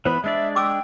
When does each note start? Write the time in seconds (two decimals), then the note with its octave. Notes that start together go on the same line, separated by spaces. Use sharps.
0.05 E3 B3 C5 B5
0.24 G#3 D4 D5 E5
0.55 G5 C6 D6 E6